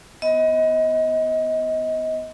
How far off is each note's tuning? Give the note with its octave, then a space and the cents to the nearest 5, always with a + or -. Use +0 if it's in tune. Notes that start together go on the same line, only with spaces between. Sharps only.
B3 +10 D#5 +25